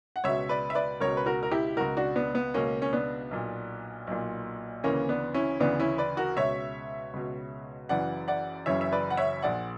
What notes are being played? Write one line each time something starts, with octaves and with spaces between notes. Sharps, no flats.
F#5
C#2 B2 C#5 E5
B4 D5
E5
B4 D5
C#2 B2 A#4 C#5
B4
F#4 A#4
A#4
E4 G4
C#2 B2 F#4 A#4
D4 F#4
B3 D4
B3
C#2 B2 A#3 C#4
C#4
B3 D4
B1 A#2
B1 A#2
D2 C#3 E3 A#3 C#4
B3 D4
C#4 E4
D2 C#3 E3 B3 D4
C#4 E4
B4 D5
F#4 A#4
C#2 B2 C#5 E5
C#2 B2
F#1 F#2 C#3 E3 D5 F#5
D5 F#5
F#1 F#2 C#3 E3 C#5 E5
E5
B4 D5
F#5
C#5 E5
A#1 A#2 D5 F#5